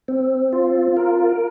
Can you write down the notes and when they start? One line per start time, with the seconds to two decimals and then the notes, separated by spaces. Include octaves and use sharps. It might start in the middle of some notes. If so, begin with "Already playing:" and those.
0.08 C4
0.53 F4
0.97 A#4